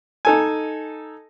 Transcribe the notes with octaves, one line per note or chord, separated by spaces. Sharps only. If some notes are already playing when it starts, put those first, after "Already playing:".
D#4 A4 G#5